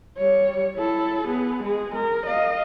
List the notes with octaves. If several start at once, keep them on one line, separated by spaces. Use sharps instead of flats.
G3 C#5
E4 A4
B3 G#4
G#3 G#4
A#4
D#5 F5